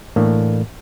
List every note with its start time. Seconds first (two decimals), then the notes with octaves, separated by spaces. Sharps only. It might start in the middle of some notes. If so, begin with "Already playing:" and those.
0.16 A2 E3 A3 A#3 D4